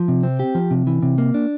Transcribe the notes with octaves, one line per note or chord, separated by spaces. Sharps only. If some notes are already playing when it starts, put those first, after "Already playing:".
Already playing: F3
C3
C4
G4
F3
C3
E3
C3
A#3
D4